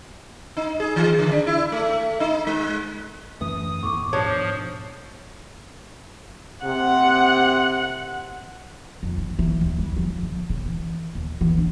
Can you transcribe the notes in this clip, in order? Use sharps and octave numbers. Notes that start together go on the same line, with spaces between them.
D#4
G#4
E3
D3
D4
E4
A3
D#4
G#3
F#2 E3 A3 D#6
D#2 A2 B3 C#6 D6
G#2 B2 F3 D4 C#5 D#6
C3 F#5
F2
D#3
E3
D#2
G3
F3
D3
C#3
E3
D#2
E3
D4